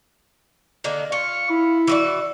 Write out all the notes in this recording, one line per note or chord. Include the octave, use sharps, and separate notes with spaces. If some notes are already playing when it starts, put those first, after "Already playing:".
D3 D#3 A#3
F4 C#6
E4
E3 F#4 D5